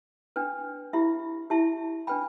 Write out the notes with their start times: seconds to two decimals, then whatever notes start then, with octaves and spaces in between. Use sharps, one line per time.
0.36 D4 B4 G5
0.93 E4 G4 E5 B5
1.50 E4 G4 E5 A5
2.07 D4 B4 G5 B5